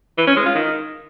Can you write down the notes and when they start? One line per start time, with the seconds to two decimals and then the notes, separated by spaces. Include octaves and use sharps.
0.18 E3
0.27 C#4
0.36 G#3
0.46 F4
0.55 D#3